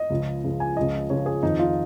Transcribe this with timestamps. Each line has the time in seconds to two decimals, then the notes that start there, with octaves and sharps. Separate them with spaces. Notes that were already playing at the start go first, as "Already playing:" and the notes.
Already playing: D#5
0.10 C#2 C#3 F3
0.44 C#2 C#3 F3
0.60 G#5
0.76 C#2 C#3 F3 D#5
1.10 C#2 C#3 F3 C#5
1.26 G#4
1.43 F2 D#3 D#4
1.59 F4